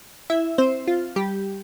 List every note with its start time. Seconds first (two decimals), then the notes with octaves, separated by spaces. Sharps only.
0.30 E4 E5
0.58 C4 C5
0.88 F4
1.16 G3 G4